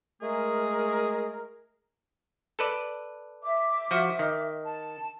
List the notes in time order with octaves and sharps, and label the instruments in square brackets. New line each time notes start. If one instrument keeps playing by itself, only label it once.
[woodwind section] G#3 A3 G#4 A#4
[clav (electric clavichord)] A4 B4 D5
[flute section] E5 D6
[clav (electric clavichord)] F3 F#4
D#3
[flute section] A5